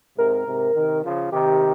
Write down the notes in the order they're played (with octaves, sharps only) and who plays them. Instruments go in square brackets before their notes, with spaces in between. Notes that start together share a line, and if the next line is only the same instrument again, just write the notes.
[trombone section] G#2 C3 [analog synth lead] A#4
[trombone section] G#2 C3
C3 D#3
C#3 F3
[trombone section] C3 D#3 [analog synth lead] G4